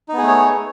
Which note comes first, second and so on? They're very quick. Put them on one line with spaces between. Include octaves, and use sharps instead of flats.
D#4 B3 G#4 A3 C#5